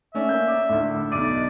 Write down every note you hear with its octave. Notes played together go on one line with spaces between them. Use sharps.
A3 C#4 D5 E5
A#3 G6
D5 D6
D2 A2
B1 D5 D#5 D#7